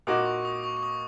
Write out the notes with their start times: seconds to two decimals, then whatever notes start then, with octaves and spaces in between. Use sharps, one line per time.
0.07 A#2 A#3 D#4 F#4 D#6
0.25 C#6
0.45 D#6
0.64 C#6
0.77 C#6
0.83 D#6